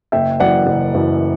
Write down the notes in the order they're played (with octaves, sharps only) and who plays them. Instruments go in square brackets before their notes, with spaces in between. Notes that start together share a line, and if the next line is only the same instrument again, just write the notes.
[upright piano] F#1 E5 G5
F#2 E3 D5 F#5
F#1
F#2 E3